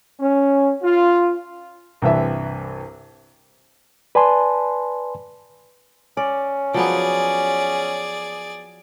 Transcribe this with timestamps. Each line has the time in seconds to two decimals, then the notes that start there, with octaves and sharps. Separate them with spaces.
0.20 C#4
0.83 F4
2.02 C2 G2 E3 E5
4.15 B4 D5 G#5 A5 C6
6.17 C#4 D5
6.74 F3 F#3 B3 G#4 D5